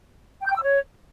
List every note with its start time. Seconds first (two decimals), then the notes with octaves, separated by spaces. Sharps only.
0.40 G5
0.46 G6
0.51 G5
0.57 E6
0.62 C#5